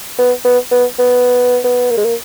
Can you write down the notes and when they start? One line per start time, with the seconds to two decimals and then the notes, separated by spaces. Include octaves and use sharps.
0.19 B3
0.45 B3
0.72 B3
0.99 B3
1.64 B3
1.91 A#3
1.97 G#3
2.05 A#3